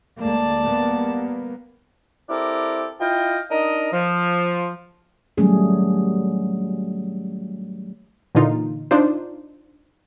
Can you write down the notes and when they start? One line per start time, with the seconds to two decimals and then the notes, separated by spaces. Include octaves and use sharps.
0.21 D2 G#3 A#3 D5 A5
0.62 G3 A#3 B3
2.29 C4 E4 G4 A4 A#4 D5
3.01 E4 F4 D#5 F5 G5
3.51 D4 D#4 A#4 D#5
3.93 F3
5.37 D#3 F#3 G3 A3 C#4 G#4
8.35 A#2 D3 E3 D#4 F4
8.91 D4 D#4 F4 C5